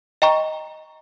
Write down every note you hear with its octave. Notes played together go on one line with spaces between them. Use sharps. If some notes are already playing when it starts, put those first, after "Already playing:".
D#5 G5 A#5 C#6